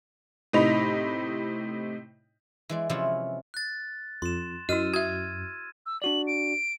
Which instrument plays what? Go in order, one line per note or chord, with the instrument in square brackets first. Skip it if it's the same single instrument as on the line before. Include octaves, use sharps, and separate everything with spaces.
[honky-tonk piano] A2 C3 D#4 D#5 B5 F7
[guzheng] E3 G#3 D5
C3 E3 F3 C#4 E4 F4
[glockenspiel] F#6 A6
[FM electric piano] F2 [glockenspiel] C6 E7
[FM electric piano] F#2 [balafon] E4 D#5 [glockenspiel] E6 F6 D#7
[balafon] F#4 E5 [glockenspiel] G#6
[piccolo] E6
[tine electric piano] D4 F#4 D5 [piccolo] F#7
[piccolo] D7